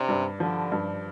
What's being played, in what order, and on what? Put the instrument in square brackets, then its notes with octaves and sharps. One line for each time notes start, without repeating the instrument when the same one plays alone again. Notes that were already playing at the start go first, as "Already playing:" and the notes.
Already playing: [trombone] C3 [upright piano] D4
[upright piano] G2
[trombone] D3 [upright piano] F3
[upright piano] G2